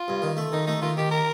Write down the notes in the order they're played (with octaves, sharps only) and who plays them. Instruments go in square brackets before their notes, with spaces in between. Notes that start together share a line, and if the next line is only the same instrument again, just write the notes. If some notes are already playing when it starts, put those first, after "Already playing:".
Already playing: [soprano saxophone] F4
[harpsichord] G2
D#3
A3
[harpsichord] D#3 [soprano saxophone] D#4
[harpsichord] A3 [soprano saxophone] D#4
[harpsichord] D#3 [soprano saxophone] F4
[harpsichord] D#3 [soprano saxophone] G4
[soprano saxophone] A#4